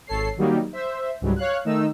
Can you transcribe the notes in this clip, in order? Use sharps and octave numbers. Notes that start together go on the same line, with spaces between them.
G#1 A4 C#5 C7
D#3 F#3 G3 A#3 D#4
C5 E5
C#2 G#2 F#3 G3
C#5 F5 F#6
D#3 A3 D#4 E6